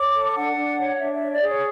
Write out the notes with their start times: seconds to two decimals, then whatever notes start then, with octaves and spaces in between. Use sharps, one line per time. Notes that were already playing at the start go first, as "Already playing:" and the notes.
Already playing: C#5 D6
0.14 A4
0.36 D4 F#5
0.57 D4
0.78 C#5
0.99 D4 E5
1.15 E5
1.21 C#5
1.31 D5
1.42 G#4
1.48 C#5